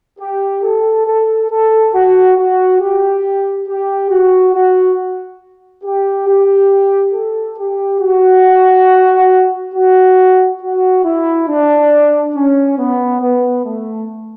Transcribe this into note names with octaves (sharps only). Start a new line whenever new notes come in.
G4
A4
A4
A4
F#4
F#4
G4
G4
F#4
F#4
G4
G4
A4
G4
F#4
F#4
F#4
E4
D4
C#4
B3
B3
A3